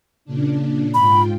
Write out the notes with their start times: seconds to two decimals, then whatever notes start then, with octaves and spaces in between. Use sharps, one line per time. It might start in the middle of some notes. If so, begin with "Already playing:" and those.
0.25 A#2 C#3 D4
0.94 G#2 F4 G5 B5